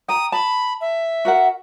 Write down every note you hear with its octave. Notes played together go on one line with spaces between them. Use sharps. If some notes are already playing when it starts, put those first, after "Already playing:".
G5 A#5 D#6
A5 B5
E5
F#4 A#4 F#5